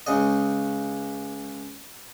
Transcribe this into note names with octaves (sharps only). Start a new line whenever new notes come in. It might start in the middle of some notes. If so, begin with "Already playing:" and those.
C#2 C#3 D#5